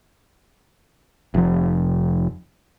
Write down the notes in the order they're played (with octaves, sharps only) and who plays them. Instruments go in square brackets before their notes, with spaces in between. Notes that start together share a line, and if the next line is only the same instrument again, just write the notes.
[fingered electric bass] F1 F3